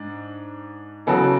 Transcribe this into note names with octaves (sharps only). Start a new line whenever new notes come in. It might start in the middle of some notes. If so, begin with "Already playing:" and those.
Already playing: G#2 D4
E2 C#3 F#3 B3 A4